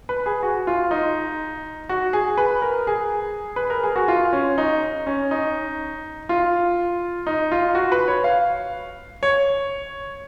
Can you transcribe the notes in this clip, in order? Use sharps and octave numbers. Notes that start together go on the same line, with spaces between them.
B4
G#4
F#4
F4
D#4
F#4
G#4
B4
A#4
G#4
B4
A#4
G#4
F#4
F4
C#4
D#4
C#4
D#4
F4
D#4
F4
F#4
B4
C#5
F5
C#5